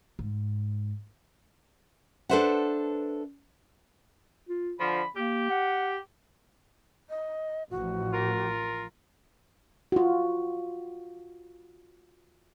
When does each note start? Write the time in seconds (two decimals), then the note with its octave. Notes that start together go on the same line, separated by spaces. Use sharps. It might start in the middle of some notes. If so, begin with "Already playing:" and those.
0.19 G#2
2.29 D4 A4 B4 C5 E5 F#5
4.49 F4
4.80 D3 F3 B5
5.16 A#3 G4
5.50 F#5
7.09 D#5
7.71 A1 F3 F#4
8.13 F4 A#4
9.92 F4 F#4